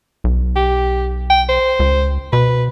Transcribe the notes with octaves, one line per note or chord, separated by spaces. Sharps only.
B1
G4
G5
C5
C#2
B2 B4